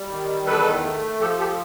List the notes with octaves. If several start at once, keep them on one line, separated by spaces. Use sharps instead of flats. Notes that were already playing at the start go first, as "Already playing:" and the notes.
Already playing: G3
D#3
E2 A4 B4
A3
F3 G4 A4
G4 A4